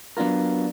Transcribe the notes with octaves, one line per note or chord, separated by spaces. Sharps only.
F#3 B3 D4 F4 A#4